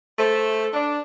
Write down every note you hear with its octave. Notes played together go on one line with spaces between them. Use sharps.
A3 C5
D4